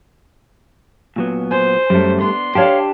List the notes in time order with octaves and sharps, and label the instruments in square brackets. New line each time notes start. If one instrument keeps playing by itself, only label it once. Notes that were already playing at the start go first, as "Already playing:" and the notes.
[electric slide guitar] A#2 F#3 B3
[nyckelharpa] C5 [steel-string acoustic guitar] G#5
[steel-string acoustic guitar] F#2 [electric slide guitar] G3 A3
[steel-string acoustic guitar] B3 D4 [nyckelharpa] C6
[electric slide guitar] D4 G4 [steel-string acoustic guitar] C#5 F5 A5